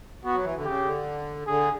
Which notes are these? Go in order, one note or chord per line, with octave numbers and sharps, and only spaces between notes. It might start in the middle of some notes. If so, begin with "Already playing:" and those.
B3 F#4
F#3
E3
D3
C#3 G4
D3
D3 G#4